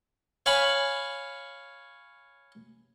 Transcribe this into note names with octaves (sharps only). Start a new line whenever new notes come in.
C#5 F5 G#5 B5